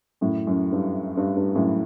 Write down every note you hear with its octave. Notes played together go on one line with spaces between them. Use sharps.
F#2 A2
F#2
G2
G2
G2
F#2 A2